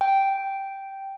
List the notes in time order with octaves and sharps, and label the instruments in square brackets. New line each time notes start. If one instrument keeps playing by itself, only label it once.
[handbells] G5